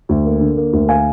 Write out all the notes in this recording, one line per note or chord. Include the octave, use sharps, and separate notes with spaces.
D2
A#3
D3
A#3
D2
F5 G#5